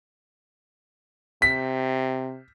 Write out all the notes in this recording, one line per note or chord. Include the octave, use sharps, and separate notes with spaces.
C3 B6